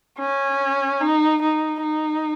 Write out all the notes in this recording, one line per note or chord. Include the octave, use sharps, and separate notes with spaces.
C#4
D#4
D#4
D#4